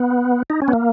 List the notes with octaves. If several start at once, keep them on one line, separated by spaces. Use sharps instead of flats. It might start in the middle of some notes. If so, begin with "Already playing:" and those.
Already playing: B3
D#4
C#4
B3
A#3